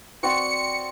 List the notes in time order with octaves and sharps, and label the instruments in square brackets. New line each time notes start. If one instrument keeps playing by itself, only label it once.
[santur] C4 F#4 D5 [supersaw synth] C#7